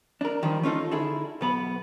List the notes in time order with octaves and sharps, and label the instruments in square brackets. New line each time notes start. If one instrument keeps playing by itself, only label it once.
[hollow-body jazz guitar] D4 A#4
D#3 F3 G3
A3 C#4 D#4 F4 F#4 A4
D3 D#4 E4 G#4 A4
B1 B3 B5